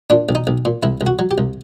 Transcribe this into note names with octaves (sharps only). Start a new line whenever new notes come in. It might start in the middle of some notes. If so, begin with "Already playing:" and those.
A#2 D4
B1
D#4
B1
A#2
C2 E4
C2
F#4
F#3
G4
C2